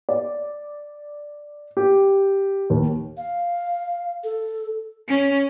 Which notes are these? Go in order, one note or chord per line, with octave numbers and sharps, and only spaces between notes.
D5
G4
D#2
F5
A4
C#4